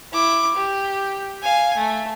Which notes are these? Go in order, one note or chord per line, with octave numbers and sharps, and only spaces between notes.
E4 D6
G4
F5 G#5
A3